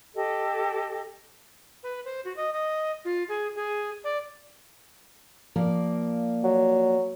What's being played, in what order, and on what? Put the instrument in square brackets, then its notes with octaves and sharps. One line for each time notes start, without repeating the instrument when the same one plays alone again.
[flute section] G4 A4 D#5
[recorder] B4
C5
F#4
D#5
D#5
F4
G#4
G#4
D5
[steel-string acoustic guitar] F3 A#3 D5
[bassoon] F#3